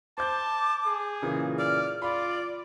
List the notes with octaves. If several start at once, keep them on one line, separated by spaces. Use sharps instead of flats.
C5 A5 D6 G6
G#4
A#2 C#3 E3
D5 F6
F4 D5 B5